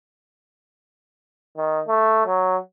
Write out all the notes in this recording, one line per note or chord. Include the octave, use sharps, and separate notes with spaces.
D#3
A3
F#3